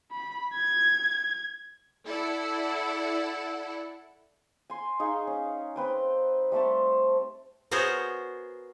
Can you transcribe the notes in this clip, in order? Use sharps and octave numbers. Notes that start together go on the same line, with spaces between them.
B5
G#6
E4 A4 D5 F#5
G#5 C6
D#4 G#4 F5 C#6
C#4
C4 B4 G5
G3 A3 C4 A5
B3 F#4 G#4 A#4 C5 C#5